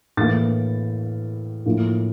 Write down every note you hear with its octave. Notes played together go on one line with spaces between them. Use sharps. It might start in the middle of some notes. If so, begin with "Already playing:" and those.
A2 E3 A#3 A6
A2 F3 A#3